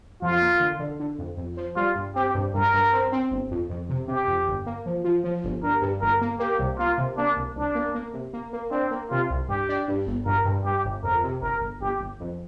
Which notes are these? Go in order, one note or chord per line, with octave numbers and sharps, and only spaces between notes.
F2 F4
A#3
D3
D3
D3
F2
F2
F3
G3 F4
G2
C4 G4
G2
G2 A#4
G2
C4
C4
G1
F2
F2
C3
C3 G4
F2
G1
A#3
F3
F3
F3
G1
G2 A#4
G2
G1 A#4
A#3
A#3 G4
C2
A#3 F4
C3
A#3 D4
C2
C2 D4
A#3
A#3
C3
A#3
A#3
C4 D4
A#3
C3 F4
C2
G2 G4
D4
G2
G1
G2 A#4
G2
G2 G4
G1
F2 A#4
C3
G1 A#4
G1
G1 G4
G1
F2